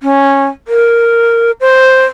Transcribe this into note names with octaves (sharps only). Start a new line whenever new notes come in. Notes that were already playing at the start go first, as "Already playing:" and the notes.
C#4
A#4
C5